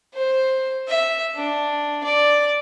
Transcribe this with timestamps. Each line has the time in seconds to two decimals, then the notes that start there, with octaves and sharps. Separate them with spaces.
0.14 C5
0.88 E5
1.35 D4
2.04 D5